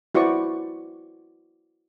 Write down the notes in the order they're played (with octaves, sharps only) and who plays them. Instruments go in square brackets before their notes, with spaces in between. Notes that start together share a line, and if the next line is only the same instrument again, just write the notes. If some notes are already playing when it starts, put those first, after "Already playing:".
[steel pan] E4 F#4 C5 D5 C#6